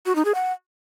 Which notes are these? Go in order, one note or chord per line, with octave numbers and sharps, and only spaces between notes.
F#4
D#4
G#4
F#5